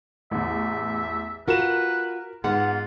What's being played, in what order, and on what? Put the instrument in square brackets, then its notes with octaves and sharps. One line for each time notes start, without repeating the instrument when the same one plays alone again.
[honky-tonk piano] A1 E2 [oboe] E5
[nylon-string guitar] F4 F#4 [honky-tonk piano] A#4 E7 [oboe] B4
[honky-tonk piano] G#2 [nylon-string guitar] B3 F#5 [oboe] F4